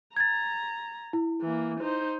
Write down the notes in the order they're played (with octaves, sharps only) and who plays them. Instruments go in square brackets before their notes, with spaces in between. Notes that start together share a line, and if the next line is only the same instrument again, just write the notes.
[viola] A#5 [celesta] G#6 A6
[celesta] E4
[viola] E3 A#3
D#4 C5